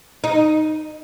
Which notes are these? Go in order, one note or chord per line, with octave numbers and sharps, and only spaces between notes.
D#4